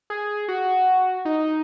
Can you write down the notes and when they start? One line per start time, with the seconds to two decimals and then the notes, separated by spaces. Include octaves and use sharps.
0.10 G#4
0.48 F#4
1.25 D#4